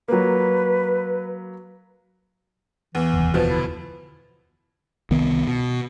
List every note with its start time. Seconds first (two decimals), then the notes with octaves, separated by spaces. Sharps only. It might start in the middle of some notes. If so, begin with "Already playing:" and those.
0.08 F#3 A#3 B4
2.95 E2 E3
3.14 F1 D#2
3.34 B2 E3 F3
3.49 D3 E4
5.11 C2 D#3 B3
5.47 B2